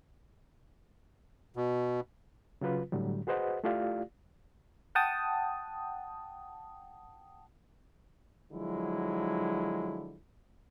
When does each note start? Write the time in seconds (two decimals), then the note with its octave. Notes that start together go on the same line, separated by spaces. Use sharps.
1.56 B2
2.61 C#3 F#3 F4 B4
2.92 A2 D3 F#3 G3
3.27 F#4 G#4 B4 C5 D#5 F#5
3.64 A3 E4 F4 G4 D5 F5
4.95 F#5 G5 A5 D#6
8.52 D3 F3 F#3 G#3 E4